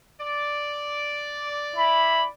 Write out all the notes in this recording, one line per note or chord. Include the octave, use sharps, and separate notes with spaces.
D5
E4 B5